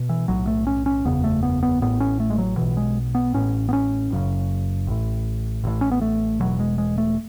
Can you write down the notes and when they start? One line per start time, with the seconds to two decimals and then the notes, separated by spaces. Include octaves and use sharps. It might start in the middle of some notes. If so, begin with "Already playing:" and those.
Already playing: B2
0.09 E3
0.28 B1 A2 F#3
0.47 A3
0.67 C#4
0.86 C#4
1.05 F#1 E2 C#3 B3
1.24 A3
1.43 B3
1.63 B3
1.82 A1 A2 B3
2.00 C#4
2.20 A3
2.30 G#3
2.38 F#3
2.57 B1 B2 E3
2.77 G#3
3.15 B3
3.34 A1 A2 C#4
3.69 B3
3.73 C#4
4.11 F#1 F#2 C#3
4.87 A1 A2
5.64 A1 A2
5.81 C#4
5.91 B3
6.01 A3
6.40 E1 E2 B2 F#3
6.60 G#3
6.78 G#3
6.98 A3